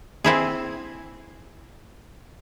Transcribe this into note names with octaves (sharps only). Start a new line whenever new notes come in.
C4 E4 G#4